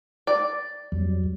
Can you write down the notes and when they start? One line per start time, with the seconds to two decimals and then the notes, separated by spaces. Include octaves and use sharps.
0.27 D5
0.92 F2 F#3 G3